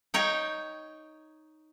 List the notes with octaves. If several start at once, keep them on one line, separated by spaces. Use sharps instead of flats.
D#4 C#5 G5